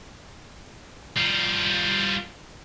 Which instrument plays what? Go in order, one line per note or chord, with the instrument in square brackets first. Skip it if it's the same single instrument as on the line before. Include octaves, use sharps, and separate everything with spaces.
[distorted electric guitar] G3 F4